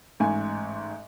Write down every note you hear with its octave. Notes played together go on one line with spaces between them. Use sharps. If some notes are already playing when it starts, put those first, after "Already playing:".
A1 G#2 G#5